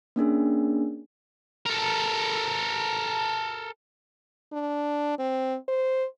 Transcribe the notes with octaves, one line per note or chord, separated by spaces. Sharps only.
A#3 C#4 D4 G#4
A4 A#4
D4
C4
C5